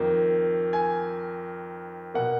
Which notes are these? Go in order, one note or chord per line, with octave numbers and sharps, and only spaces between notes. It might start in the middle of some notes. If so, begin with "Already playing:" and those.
Already playing: F2 D#3 A#3
G#5
B2 A#3 F#5